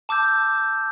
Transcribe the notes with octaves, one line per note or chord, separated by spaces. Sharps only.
A5 D6 E6 G6